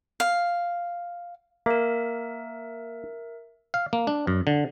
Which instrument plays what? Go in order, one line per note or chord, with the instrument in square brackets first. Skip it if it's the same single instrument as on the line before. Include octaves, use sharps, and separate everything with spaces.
[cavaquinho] F5
[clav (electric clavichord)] A#3 [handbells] A#4 E5
[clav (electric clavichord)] F5
A#3
D4
F#2
D3